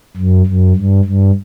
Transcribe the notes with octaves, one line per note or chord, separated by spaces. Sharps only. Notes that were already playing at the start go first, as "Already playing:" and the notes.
F#2
F#2
G2
G2